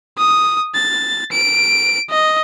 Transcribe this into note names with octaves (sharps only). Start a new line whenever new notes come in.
D#6
A6
D7
D#5